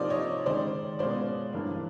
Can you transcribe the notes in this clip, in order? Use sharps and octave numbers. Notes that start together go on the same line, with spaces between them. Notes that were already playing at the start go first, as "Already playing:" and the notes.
Already playing: C3 F3 A#3 D#4 C5 D5
C#5 D#5
D#3 G#3 C#4 C5 D5
B2 G#3 C#4 F4 C5 D5
G2 E3 G3 A#3 D4